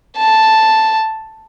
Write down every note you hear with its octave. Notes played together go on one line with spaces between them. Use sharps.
A5